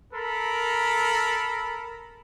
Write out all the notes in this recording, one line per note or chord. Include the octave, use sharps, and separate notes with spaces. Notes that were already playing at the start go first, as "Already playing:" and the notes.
A4 A#4 B5